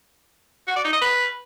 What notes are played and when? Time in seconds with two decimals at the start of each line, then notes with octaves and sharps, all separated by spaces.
0.68 F#4
0.76 D5
0.85 D#4
0.93 D#5
1.02 B4